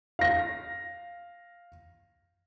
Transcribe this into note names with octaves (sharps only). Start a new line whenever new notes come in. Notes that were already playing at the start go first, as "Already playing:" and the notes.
F5 A#6